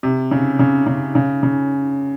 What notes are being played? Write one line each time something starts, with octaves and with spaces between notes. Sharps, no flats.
C3
C#3
C#3
C#3
C#3
C#3